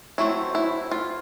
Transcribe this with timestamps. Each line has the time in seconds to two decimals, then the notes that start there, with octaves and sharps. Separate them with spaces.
0.18 F#3 A3 C4 E4
0.55 E4
0.91 F4